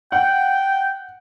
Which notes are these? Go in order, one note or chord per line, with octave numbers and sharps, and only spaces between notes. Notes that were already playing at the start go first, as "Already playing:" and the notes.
F#5 G5